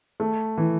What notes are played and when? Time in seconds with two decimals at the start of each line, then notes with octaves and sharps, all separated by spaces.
0.20 A3
0.58 E3